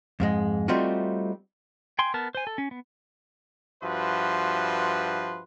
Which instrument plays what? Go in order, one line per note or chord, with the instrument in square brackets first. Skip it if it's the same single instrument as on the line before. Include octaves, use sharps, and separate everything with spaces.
[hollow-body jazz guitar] F2 G#2 G#3
G3 A3 C4 D#4 F4 F#4
[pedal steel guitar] G5 G#5 C6
B3 A#4 A5
C5 G#5
A4
C#4
B3
[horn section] G2 F3 F#4 B4 E5 C6